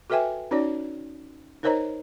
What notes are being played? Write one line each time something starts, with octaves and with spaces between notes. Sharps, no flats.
F#4 A4 B4 E5 G5 G#5
C#4 D#4 F#4 C#5 D5
D#4 A#4 C5 C#5 D#5 A#5